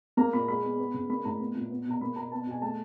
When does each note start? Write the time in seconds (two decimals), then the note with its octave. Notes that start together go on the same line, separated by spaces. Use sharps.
0.17 A#3 A#5
0.33 A#2 B5
0.48 G#3 B5
0.63 B3
0.79 B3
0.94 C#3
1.09 A#3 B5
1.25 A2 A#5
1.40 B3
1.55 A#2
1.70 B3
1.86 B2 A#5
2.01 A#3 B5
2.16 B2 A#5
2.31 B3 A5
2.47 B2 G#5
2.62 A3 A5